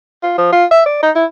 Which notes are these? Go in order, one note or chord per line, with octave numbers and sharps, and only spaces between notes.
F4
F3
F4
E5
D5
D#4
E4